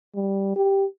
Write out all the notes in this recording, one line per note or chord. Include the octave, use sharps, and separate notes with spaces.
G3
G4